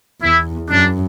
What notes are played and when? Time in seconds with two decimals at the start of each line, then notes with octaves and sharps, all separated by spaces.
0.21 E2 E4
0.69 F#2 D4